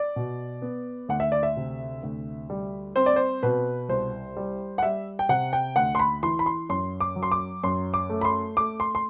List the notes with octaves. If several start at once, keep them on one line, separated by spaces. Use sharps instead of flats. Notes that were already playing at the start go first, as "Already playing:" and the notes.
Already playing: D5
B2
B3
D2 F#5
E5
D5
E5
C3
D2
G3
C4 C5
D5
C5
B2 B4
C2 C5
G3
F#5
G3 E5
G5
C3 F#5
G5
D2 F#5
C6
B5
E3 C6
B5
C6
F#2 C6
D6
F#3
C6
D6
F#2 C6
D6
A3
B5
C6
A3 D6
C6
C6